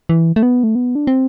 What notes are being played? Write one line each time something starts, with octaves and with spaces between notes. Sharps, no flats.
E3
A3
B3
A3
B3
D4
C4